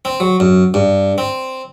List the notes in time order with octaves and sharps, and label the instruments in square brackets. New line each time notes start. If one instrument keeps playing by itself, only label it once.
[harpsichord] C4
F#3
F#2
G2
C4